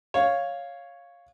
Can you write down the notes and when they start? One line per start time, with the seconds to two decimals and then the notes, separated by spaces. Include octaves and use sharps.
0.14 C#5 F5